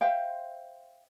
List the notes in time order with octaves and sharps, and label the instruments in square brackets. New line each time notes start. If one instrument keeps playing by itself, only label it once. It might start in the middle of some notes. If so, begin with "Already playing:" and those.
[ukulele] C5 E5 F5 G5